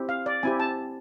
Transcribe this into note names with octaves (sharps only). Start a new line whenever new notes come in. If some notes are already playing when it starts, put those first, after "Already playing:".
Already playing: C4 E4 G4
F5
D5
C4 E4 G4 G#5
A5